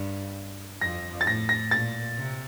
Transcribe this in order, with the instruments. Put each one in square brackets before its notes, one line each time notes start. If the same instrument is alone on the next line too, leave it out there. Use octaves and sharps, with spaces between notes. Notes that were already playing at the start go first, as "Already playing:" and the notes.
Already playing: [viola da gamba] G2
[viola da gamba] F2 [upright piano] A#6
[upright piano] A6
[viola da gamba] A2 [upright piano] A#6
[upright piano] A#6
[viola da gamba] A#2 [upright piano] A6
[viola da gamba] C3